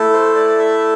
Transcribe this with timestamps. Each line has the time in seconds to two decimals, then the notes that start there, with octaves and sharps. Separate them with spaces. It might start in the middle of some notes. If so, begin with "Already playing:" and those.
Already playing: A3 E4 A4
0.13 C5
0.35 D5
0.59 E5